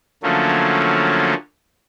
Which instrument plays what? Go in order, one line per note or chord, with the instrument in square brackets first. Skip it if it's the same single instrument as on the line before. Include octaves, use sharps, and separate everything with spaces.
[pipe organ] D3 F3 F#3 A3 A#3 C#4